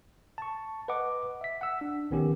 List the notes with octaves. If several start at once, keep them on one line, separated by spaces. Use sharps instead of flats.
A5 C#6
B4 D#5 F#5 D6
E5 B6
F#5 E6
D4
A#1 D#3 B3 C#4 G4